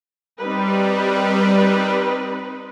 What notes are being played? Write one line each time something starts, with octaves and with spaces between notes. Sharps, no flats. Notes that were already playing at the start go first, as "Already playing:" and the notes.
G3 C4 D#4 B4